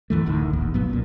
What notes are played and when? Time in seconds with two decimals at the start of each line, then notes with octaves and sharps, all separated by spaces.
0.10 F#2 E3 A3
0.26 D1 D2 A2 D#3
0.53 D#1 A1 D#2
0.74 B1 G2 F#3 B3
0.89 B1 F#2 A#2